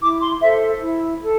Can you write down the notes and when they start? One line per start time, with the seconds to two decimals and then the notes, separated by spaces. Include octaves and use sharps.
0.01 E4 D6
0.21 C6
0.41 A4 C5 E5
0.81 E4
1.21 A4